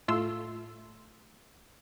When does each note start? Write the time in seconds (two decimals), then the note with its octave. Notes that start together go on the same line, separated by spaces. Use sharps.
0.08 A2 A3 F4 C6 E6